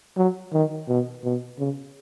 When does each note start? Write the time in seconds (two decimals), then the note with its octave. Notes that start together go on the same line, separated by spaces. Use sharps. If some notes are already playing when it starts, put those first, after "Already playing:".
0.17 F#3
0.53 D#3
0.88 B2
1.24 B2
1.59 C#3